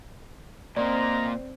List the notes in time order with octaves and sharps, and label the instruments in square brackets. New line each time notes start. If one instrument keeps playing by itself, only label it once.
[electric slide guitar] A#2 A#3 [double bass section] C4 [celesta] D5 [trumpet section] D#5 A#5 C6